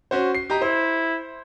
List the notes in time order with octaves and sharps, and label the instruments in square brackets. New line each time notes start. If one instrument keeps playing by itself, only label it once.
[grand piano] C#4 F#4 C5
C7
G4 D#5 A#5
[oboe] E4 [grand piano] C5